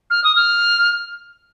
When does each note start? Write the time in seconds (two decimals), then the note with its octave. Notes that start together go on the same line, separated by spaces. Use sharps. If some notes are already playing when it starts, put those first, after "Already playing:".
0.10 F6
0.24 D#6
0.36 F6